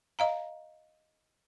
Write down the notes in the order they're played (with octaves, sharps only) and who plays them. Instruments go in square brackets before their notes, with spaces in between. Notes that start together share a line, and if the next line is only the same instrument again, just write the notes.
[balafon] D#5 F5 A#5